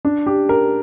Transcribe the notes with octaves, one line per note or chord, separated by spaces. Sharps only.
D4
G4
A#4